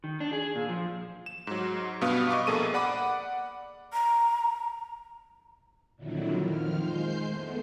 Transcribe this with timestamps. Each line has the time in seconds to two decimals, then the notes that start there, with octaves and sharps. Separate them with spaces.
0.04 D#3
0.20 D4
0.33 G#4
0.56 A#2
0.69 F3
1.26 E7
1.47 G#2 F#3
2.01 G2 B2 B3 F5 D#6
2.31 D#5 C#6 D6
2.47 A#1 A#3 G#4 A4 D#7
2.74 D5 F#5 B5 D6
3.93 A#5
5.96 F2 A#2 D3 D#3 F#3 E4
6.43 F2 D#3 F3 F6
6.76 G#3 C5 G6 C7
7.27 A3 B3